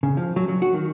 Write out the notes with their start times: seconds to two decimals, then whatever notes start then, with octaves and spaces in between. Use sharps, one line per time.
0.03 C#3
0.17 F3
0.36 F#3
0.48 F#3
0.62 F#4
0.74 D#3